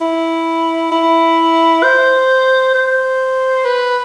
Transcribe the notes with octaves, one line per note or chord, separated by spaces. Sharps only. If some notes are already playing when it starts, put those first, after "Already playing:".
E4
E4
C5
C5
B4